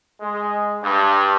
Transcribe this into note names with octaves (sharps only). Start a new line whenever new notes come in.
G#3
G2